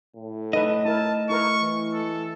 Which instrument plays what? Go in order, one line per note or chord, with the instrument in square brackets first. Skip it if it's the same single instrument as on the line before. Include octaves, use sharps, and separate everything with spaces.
[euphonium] A2
[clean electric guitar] A3 D#5 [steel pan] D#4 A4 B4
[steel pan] E4 A#4 [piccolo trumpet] A5
[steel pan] E4 A#4 B4 [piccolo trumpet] C#6
[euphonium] E3
[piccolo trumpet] A4